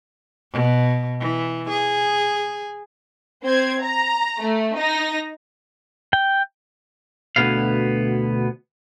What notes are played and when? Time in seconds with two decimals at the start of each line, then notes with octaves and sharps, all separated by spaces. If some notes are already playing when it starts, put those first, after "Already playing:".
0.52 B2
1.20 E3
1.69 G#4
3.43 C4 C5 G#6
3.82 A#5
4.40 A3
4.76 D#4 A#6
6.13 G5
7.36 D2 G#2 B2 B3 F5